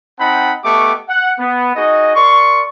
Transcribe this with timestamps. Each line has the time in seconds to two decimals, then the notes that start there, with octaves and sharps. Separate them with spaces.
0.19 C4 D#4 F#5 G5 A5 B5
0.63 A3 B3 G4 D#5 C#6 D6
1.09 F#5
1.39 B3
1.75 D#4 F#4 G#4 D#5
2.15 A#4 D5 C6 C#6